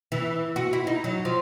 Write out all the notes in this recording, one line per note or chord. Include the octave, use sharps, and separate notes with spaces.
E3
F#4
E4
D#4
F#3
F3